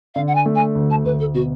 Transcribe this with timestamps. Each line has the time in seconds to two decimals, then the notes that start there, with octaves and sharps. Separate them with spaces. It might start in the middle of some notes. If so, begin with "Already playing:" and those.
0.15 D3 F5
0.27 F#5
0.35 G#5
0.46 A3
0.55 G#5
0.75 D2
0.90 A5
1.05 D2 B4
1.20 A4
1.34 B2 F#4